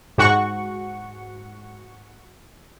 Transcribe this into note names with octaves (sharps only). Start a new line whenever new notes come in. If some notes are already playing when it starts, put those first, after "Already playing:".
G#2 F#4 F#5 C#6